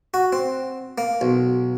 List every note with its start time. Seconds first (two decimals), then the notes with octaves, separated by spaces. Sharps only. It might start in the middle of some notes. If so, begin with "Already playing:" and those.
0.14 F#4
0.33 C4
0.98 A#3
1.21 B1